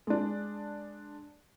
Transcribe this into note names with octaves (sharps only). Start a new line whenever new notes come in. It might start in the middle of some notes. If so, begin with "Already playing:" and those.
G#3 D4